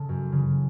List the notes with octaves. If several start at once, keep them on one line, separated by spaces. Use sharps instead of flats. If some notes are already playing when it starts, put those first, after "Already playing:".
Already playing: C#3 A4
F#2
C#3 E3